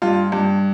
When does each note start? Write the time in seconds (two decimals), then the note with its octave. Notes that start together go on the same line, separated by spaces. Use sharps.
0.02 G2 F4
0.32 G2